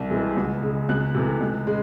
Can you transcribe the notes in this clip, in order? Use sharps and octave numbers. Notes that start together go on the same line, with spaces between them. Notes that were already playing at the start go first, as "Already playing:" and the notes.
Already playing: C2
C3 E3 G#3
C#2
C#3 G#3
C#2 F#6
C3 E3 A3
C#2
C#3 G#3